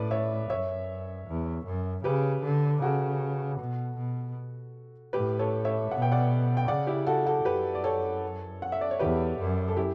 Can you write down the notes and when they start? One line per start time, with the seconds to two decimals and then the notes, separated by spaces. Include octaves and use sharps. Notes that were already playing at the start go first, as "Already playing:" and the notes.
Already playing: A2 B4 D5
0.11 C#5 E5
0.50 F#2 C#5 E5
1.27 E2
1.66 F#2
2.04 C#3 G4 B4
2.43 D3
2.82 C#3 F#4 A4
3.59 B2
3.98 B2
5.13 A2 G4 B4
5.39 A4 C#5
5.65 C#5 E5
5.91 B2 F#5
6.02 G5
6.12 D5 F#5
6.57 G5
6.68 C#3 D5 F#5
6.87 E4 G4
7.07 F#4 A4
7.26 F#4 A4
7.45 F#2 G4 B4
7.75 D5
7.84 A4 C#5
8.62 F#5
8.72 E5
8.81 D5
8.91 C#5
8.99 E2 G4 B4
9.39 F#2
9.68 A4
9.77 E4 G4